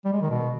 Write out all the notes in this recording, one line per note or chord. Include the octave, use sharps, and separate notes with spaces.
G3
G#3
D#3
B2